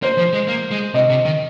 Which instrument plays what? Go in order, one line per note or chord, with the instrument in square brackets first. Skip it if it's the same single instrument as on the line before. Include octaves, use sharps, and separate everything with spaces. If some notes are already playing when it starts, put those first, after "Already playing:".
[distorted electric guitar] A#3 [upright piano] C5
[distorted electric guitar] F3
G#3
A#3
G#3
[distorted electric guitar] C3 [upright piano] D#5
[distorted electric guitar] C3
D#3